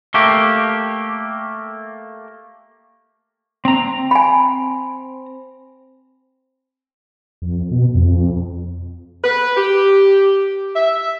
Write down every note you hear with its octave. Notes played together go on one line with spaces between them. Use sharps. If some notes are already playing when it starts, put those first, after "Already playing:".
A3 A#3 G4
C4 A#5
G#5 B5
F2
B2
F2
B4
G4
E5